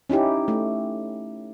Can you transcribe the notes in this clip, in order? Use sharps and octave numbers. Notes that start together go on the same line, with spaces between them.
C#4 D#4 E4 G4
A3